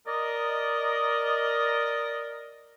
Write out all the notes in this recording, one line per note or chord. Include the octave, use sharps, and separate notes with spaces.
A#4 D5 D#5